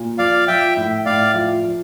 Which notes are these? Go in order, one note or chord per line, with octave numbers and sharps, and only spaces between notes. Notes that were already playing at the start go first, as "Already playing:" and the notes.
Already playing: A#2
F3 D5 F5
F3 E5 G5
A2
A2 D5 F5
F3
F3